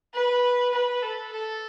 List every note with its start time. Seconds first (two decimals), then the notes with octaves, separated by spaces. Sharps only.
0.14 B4
0.74 B4
1.02 A4
1.33 A4